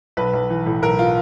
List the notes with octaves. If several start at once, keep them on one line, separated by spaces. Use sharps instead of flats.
B1 B4
B1
E3
A2
B1 A#4
F4